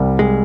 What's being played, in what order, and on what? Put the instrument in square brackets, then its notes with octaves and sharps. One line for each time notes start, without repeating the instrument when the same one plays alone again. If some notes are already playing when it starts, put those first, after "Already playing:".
Already playing: [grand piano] C2 C3 G3
[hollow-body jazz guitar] G#3